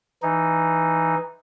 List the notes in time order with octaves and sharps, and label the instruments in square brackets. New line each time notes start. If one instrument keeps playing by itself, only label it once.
[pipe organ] E3 D#4